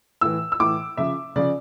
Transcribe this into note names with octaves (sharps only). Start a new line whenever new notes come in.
A2 E3 E6
E6
A2 E3 D6
C#3 F3 E5
C#3 F3 D5